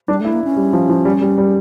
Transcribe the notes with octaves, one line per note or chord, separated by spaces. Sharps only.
G3 D4
A3 E4
A#3
C#4
G3
F3
F3
G3
G3
G3